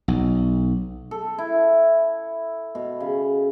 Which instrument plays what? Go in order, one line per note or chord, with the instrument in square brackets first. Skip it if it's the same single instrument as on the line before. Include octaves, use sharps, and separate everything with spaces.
[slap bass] B1
[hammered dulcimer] A4
E4
B2
C#3